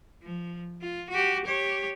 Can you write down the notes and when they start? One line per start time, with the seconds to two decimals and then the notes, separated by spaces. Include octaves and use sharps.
0.23 F3
0.81 F4
1.10 F#4 G4
1.45 G4 C#5